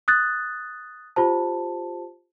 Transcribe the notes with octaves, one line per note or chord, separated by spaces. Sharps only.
D#6 F#6 A6
F4 G4 C5 A5